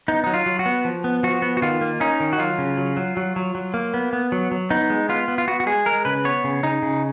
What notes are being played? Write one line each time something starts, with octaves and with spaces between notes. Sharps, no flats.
B3 D#4
F#3 D#4
F4
F#3
F#4
B3
F3
B3
F3 F#4
B3
F#4
D#3 F4
A#3
C#4 D#4
D#3
F#4
F#3 F4
C#3
F#3
F#3
F#3
F#3
F#3
A#3
B3
B3
F#3
F#3
B3 D#4
G#3
B3 F4
B3
F4
B3 F#4
F#4
G#3 G#4
G#3 A#4
C#3 B4
B3 C#5
C#3
C#3 D#4
C#3